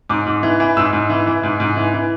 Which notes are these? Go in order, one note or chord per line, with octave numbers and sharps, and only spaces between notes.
G#2 D6
G#2
E3
E3
G#2 E6
G#2
E3
E3
G#2
G#2
E3
E3